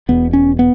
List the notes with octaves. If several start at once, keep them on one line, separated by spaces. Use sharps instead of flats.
E1 E2 B2 B3
C#4
B3